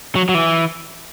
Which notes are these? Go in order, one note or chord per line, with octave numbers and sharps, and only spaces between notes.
F#3
F#3
E3